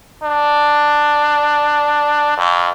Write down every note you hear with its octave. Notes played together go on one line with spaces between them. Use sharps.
D4
F2